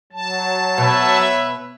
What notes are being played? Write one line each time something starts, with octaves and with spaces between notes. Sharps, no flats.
F#3 A5
B2 B4 C#5 E5